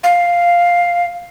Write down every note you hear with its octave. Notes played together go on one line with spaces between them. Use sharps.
F5